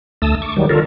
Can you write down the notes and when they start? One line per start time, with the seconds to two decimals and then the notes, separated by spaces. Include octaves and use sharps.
0.22 D2 A3 A5 D#6 E6
0.42 C#6 D6
0.57 D#3 F#3 G3
0.69 D3 F4 A4 A#4